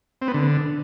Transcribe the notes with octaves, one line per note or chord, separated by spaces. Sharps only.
C4
B3
D3